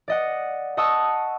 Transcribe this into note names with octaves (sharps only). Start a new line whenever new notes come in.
D5 D#5 F#5
D#5 F#5 A5 C#6 D#6 E6